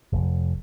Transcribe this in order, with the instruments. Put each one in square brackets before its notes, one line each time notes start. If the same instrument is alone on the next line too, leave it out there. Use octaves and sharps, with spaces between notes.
[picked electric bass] F1